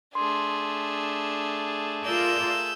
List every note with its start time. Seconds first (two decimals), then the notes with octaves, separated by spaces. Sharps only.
0.15 A3 D4 G#4 C6
2.05 F4 A#4 D5 E6 G6